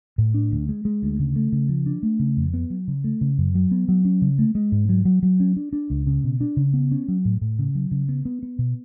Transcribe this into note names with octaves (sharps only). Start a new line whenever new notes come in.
A2
D4
D2
G#3
G#3
D2
C#3
A3
C#3
F3
D4
A3
C#3
F2
B3
F#3
C#3
A3
C#3
F#2
F#3
B3
F#3
C#4
C#3
A3
G#3
G#2
F#3
F#3
F#3
C#4
D4
D4
C#2
C#3
B2
D4
C#3
B3
C#4
F#3
A2
A2
C#3
F#3
C#3
B3
B3
B3
B2